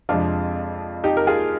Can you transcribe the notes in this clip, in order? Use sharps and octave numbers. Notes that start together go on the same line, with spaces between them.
F2 C3 F3 G#3 D4 F4
D#4 G4
A#4
F4 G#4